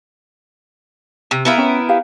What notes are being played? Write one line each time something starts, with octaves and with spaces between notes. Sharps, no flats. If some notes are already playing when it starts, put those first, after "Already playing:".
C3
B3 E4 G4 A#4 F5 B5
C#4 E5 G5
G4 F5